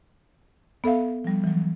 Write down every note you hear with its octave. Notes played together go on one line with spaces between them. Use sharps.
B3 A4 E5 F5
F3 G3
E3 F#3